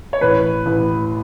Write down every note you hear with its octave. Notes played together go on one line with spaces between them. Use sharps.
C#5
A1 B4
A1